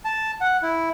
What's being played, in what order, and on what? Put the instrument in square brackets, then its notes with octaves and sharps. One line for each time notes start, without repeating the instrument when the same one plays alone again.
[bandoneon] A5
F#5
E4